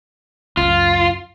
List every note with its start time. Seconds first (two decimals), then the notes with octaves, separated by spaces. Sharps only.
0.57 C#2 F#2 F4